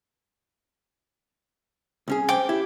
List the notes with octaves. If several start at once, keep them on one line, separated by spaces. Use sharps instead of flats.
C2 C#4 G#4
C5 G5 D6
E4 G4